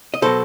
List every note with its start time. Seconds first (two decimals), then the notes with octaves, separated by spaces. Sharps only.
0.14 D#5
0.22 B2 F#3 A4 C5